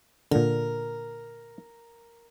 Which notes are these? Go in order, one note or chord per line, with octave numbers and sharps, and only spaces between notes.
A#2 D3 A#4